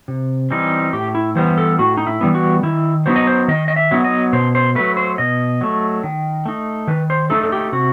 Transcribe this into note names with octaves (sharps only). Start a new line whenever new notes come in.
C3
E3 G3 C4 D#4
A2 G4
E4
E3 G3 B3 C5
A4
A2 F#4
D#4
E4
E3 G3 B3
F#4
D#3 E4
F#3 B3 D#4 C5
D#5
C5
D#3 D#5
D#5
E5
F#3 B3 D#4
D#5
B2 C5
C5
F#3 A3 B4
C5
B2 D#5
F#3 A3
D#3
A3 D#4
D#3 B4
C5
A3 D#4 A4
A4
G4
C3 F#4